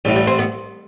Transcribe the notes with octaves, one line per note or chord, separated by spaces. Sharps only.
A1 A2 E3 G3
G3
C4
B3